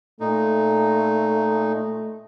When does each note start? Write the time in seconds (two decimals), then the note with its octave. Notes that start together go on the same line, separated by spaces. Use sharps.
0.20 A#2 A3 D#4